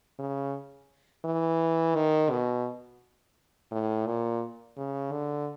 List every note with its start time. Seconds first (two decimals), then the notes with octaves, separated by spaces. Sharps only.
0.19 C#3
1.25 E3
1.95 D#3
2.31 B2
3.72 A2
4.06 A#2
4.77 C#3
5.12 D3